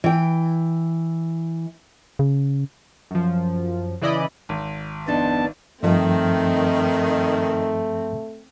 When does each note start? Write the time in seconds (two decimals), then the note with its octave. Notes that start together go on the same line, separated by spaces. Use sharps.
0.04 E3 G5
2.19 C#3
3.11 F#2 F3
4.02 C#3 E3 E4 D5 D#5 B5
4.49 G#1
5.08 F2 B3 D4 D#4 A5
5.83 G2 D#3 F3 A3 C4